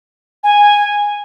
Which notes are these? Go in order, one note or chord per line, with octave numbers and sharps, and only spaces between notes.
G#5